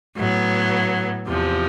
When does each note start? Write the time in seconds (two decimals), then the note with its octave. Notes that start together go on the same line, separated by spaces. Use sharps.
0.16 A2 F#3 B3
1.28 E2 C3 F3